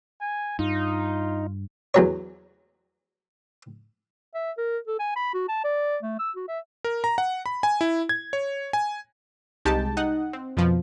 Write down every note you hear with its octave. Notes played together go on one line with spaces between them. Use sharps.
G#5
G2 D#4 F4
E2 F#3 C#5
E5
A#4
A4
G#5
B5
F#4
A5
D5
A3
E6
F#4
E5
A#4
A#5
F#5
B5
G#5
E4
G#6
C#5
G#5
C2 G#3 D#4 G4 G5 A5
D#4 D#5 F#5
C4
F2 B2 F3